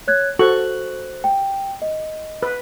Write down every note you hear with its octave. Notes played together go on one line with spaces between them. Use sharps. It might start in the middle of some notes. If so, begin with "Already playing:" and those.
C#5 F#6 G#6
F#4 A4 C5 C#6 F#6 F#7
G5
D#5
B4